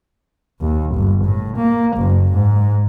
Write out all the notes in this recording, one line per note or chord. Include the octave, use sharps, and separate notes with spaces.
D#2
G1
A2
A#3
F#1
G#2